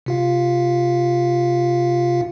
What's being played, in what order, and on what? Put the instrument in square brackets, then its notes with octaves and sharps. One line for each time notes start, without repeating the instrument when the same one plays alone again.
[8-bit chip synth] C3 F4 F5